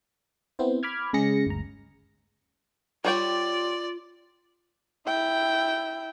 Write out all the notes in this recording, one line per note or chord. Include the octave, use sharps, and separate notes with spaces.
B3 C4 E4 C5
B5 D6 F6 G#6
C#3 G#3 C#4 G#4 A#6 C#7
G1 D2 A#5
G3 F4 C#5 D5 G5
E4 G5